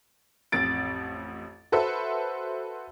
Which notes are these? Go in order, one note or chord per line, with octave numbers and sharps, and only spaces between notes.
A1 F2 A6 D7
F#4 A4 B4 C5 E5